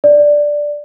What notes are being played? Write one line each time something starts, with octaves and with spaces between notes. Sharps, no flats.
D5